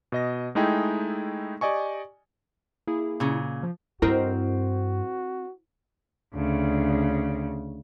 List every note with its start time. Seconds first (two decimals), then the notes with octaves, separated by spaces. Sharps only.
0.12 B2 D#5 A#6
0.55 G#3 A3 D#4 E4 G#4 G5
1.61 G4 D5 D#5 G#5 C#6
2.87 A#3 E4 G#4
3.20 A#2 C#3
3.63 F3
4.02 G2 C4 E4 F#4 A#4 D#5
6.35 D2 C#3